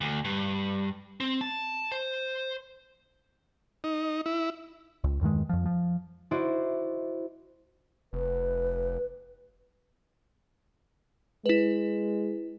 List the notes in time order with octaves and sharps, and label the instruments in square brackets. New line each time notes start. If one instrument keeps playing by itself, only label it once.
[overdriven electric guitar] D2
G2
C4
A5
C5
[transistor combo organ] D#4
E4
[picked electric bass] C#2
E2 G2 D#3 G#3
F2 F3
F3
[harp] E4 F#4 C5 D5 D#5
[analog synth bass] F1 [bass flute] B4
[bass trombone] G#3 [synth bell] E4 B4